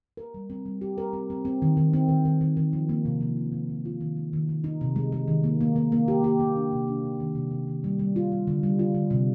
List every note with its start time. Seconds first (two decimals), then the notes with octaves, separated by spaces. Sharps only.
0.17 A#4
0.34 G3
0.50 C4
0.66 G3
0.81 G4
0.98 A#4
1.13 C4
1.30 C4
1.45 C4
1.62 D#3
1.77 D#3
1.93 C4
2.09 D#3
2.25 D#3
2.41 D#3
2.57 D#3
2.73 F3
2.89 A#3
3.05 C3
3.21 F3
3.36 C3
3.52 C3
3.69 C3
3.85 F4
4.01 D#3
4.17 G#3
4.33 D#3
4.49 D#3
4.64 D#4
4.81 C3
4.96 G#3
5.12 G#3
5.28 D#3
5.44 A#3
5.61 A#3
5.76 A#3
5.92 A#3
6.08 G4
6.24 G4
6.40 A#3
6.56 D4
6.72 C3
6.88 D4
7.04 C3
7.20 D#3
7.35 C3
7.51 C3
7.68 D#3
7.84 G3
7.99 G3
8.16 F4
8.32 G3
8.47 D3
8.63 G3
8.79 F4
8.95 D3
9.10 C3